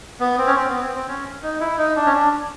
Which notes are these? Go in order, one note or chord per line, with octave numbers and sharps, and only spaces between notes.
B3
C4
C#4
C4
B3
C4
C4
C#4
D#4
E4
D#4
D4
C#4
D4